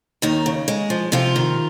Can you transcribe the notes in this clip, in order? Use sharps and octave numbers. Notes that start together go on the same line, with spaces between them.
D#2 D#3 D#4
C#3
G#3
F3
C3 F3 F4
D#3